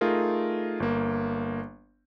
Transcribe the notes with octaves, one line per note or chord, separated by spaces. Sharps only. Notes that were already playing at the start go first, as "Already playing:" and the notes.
A3 D#4 F4 G#4 A#4
G1 A#3